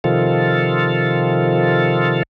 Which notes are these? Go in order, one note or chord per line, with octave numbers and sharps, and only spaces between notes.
C3 D#3 F3 F4 A4